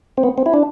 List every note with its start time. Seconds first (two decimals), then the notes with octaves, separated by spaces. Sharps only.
0.18 C4
0.24 B3
0.38 C4
0.46 E4
0.54 D4